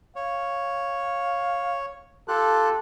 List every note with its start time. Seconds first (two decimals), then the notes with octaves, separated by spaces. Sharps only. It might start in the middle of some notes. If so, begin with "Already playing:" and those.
0.16 C#5 F5
2.28 F4 G4 A4 F#6